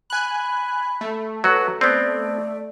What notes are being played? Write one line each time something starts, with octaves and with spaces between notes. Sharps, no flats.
G#5 B5 F#6
A3
F#3 F#4 B4
B3 C4 D5